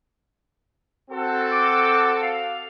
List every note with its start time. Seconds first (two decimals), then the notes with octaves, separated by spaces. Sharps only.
1.11 C4 F#4 A4
1.52 D6
2.22 F5